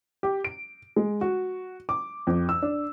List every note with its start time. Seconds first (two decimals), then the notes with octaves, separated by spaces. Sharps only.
0.23 G4
0.45 D7
0.96 G#3
1.21 F#4
1.89 D6
2.27 F2
2.49 E6
2.62 D4